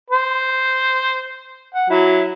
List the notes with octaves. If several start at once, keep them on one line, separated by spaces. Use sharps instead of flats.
C5
F#5
F#3 E4